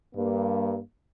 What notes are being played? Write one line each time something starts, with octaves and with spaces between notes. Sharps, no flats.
G2 A#3